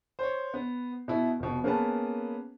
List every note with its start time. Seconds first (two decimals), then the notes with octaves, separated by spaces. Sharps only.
0.19 C5 C#5
0.54 B3
1.08 B2 B3 E4
1.40 F1 B2
1.64 A#3 B3 C#4 G#4 B4 A5